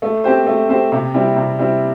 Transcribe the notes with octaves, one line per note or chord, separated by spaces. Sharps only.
A3
C4 G4 C5
A3
C4 G4 C5
C3
G3 C4 E4
C3
G3 C4 E4